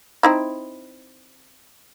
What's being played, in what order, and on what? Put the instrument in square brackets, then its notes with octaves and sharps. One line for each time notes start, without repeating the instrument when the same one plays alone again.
[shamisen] C4 D#4 E4